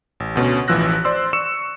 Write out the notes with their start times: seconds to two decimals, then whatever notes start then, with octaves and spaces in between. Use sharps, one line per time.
0.20 A1
0.35 D2 B2 C#4
0.68 A1 E3 F3 E6 F#6 A#6
1.05 C5 D5 C6 E6
1.33 C#6 E6 C#7 E7